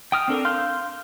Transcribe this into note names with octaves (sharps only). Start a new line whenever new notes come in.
G5 D#6 F6
C4 D4 A4 A#4
F5 C6 F6 G6